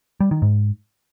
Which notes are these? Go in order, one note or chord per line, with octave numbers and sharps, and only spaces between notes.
G3
D#3
G#2